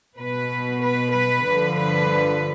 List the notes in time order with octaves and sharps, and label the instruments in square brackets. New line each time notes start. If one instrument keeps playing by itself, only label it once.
[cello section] B2 B4
B4
B4
G2 D3 F3
B4